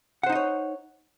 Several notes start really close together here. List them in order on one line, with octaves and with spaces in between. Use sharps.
F#5 C5 D#4 D#5 C#5